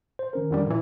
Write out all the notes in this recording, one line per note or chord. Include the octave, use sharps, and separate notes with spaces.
C5
D#3 C#4 A#4
F2 D3 G3
A#2 E3